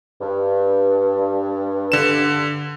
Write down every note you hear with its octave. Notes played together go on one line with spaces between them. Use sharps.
G2
D3 E7